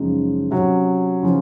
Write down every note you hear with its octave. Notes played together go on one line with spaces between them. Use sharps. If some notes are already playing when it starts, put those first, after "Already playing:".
Already playing: F#2 C#3 F3 G#3 D#4
C3 F#3 C#4
C#3 F3